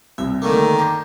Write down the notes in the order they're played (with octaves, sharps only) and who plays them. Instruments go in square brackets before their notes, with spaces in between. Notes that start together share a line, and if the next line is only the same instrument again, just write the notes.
[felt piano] C2 [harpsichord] E5
[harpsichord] D3 A3 A#3 [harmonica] D#3
[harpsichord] D4 [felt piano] A#5 G6